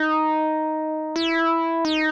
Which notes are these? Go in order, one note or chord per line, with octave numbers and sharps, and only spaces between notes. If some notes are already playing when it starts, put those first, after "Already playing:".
Already playing: D#4
E4
D#4